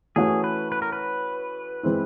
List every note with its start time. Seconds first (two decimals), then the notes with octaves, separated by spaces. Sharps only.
0.16 E3 A3 C#4 F#4 G#4
0.44 B4
0.72 B4
0.82 A#4
0.93 B4
1.83 E3 G#3 C4 E4